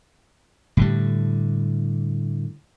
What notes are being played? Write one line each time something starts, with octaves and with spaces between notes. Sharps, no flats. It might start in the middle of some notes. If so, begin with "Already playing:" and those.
A2 D3 G3